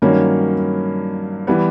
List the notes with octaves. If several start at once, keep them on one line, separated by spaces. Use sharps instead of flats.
G2 D#3 F#3 A#3 C#4
E3 G3 B3